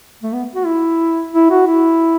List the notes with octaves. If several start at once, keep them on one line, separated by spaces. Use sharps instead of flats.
A3
B3
F#4
E4
E4
F#4
E4